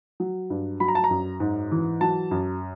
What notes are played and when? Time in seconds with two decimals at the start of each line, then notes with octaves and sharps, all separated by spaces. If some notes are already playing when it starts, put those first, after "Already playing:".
0.20 F#3
0.50 G2
0.80 F#3 B5
0.88 A#5
0.95 A5
1.04 A#5
1.10 F#2
1.40 G#2
1.71 E3
2.01 F#3 A5
2.31 F#2